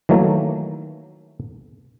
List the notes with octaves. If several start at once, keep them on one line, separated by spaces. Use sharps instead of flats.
D#3 E3 F#3 A3 A#3